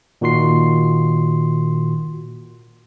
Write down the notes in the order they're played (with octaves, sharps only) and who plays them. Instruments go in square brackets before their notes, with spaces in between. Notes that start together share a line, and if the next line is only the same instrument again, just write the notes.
[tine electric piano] A#2 D#3 F#4 C6 C7